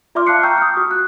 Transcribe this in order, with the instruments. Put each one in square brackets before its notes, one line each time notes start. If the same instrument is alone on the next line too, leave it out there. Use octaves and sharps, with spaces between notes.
[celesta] F4 D5 E5 C6 D6 F6
F5 A5 F6 F#6 C7 C#7
G5 A#5 C#6 D6 E6 G6
D#6 F6
F#4
F#6